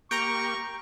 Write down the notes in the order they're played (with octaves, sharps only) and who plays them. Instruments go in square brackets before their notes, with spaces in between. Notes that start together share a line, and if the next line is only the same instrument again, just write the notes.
[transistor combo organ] A#3 G4 [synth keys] G5 A#5 [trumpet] C#6